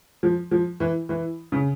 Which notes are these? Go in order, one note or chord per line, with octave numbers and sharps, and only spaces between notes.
F3
F3
E3
E3
C#3